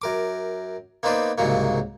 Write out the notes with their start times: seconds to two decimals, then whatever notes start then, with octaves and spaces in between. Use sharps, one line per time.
0.02 F#2 A#4 D6
1.03 A#3 B3 D#4 B4 C5 D5
1.38 C2 G#2 C#3 F#3 A#3